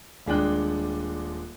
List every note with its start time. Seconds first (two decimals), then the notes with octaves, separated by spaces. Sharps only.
0.26 D#1 G#3 D4 G5 F#6